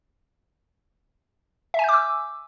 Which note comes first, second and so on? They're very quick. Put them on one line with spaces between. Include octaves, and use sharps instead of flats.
E5 G#5 G6 D6 E6